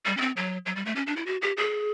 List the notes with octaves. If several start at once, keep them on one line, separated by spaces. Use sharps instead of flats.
G3
C#4
C4
F#3
F#3
G3
A3
C#4
D4
E4
F#4
G4
G#4